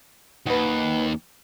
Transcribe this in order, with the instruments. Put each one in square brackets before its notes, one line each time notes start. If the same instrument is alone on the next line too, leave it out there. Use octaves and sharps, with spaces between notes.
[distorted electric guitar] D#2 [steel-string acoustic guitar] B4 F#5